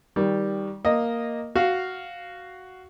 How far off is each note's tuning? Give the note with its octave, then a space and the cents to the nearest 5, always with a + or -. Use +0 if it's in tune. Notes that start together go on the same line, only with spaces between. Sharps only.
D#3 +20 G3 +0
A#3 +0 D#5 -5
F#4 +5 F5 +0